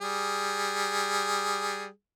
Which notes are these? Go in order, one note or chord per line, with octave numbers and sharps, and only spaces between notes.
G3 G#4